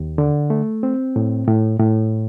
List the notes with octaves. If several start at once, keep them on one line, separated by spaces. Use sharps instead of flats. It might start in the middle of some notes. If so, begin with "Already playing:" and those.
Already playing: D#2
D3
A3
C4
A2
A2
A2